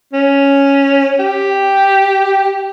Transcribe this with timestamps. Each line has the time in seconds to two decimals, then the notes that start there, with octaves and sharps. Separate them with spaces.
0.13 C#4
1.19 G4